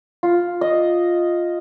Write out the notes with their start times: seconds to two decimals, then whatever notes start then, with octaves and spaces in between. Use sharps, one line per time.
0.23 F4
0.61 D#5